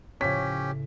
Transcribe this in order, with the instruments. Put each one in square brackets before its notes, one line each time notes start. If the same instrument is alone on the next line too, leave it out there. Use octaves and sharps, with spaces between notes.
[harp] A2 C#3 [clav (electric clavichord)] F3 C#5 [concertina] C#4 G4 [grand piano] B6